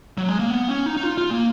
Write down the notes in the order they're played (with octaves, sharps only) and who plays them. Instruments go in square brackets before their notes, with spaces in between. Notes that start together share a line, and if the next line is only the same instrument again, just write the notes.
[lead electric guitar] F#3
G#3
A#3
B3
C#4
D#4
D#4
F4
F4
A#3